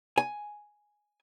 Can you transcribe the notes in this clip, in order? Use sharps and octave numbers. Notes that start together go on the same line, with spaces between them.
G#5